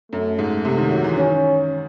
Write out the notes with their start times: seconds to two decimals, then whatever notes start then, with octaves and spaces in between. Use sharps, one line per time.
0.12 F#2 A3
0.39 G#2
0.64 C3
0.78 D#3
0.91 F#3
1.04 E3
1.17 D#3 C#4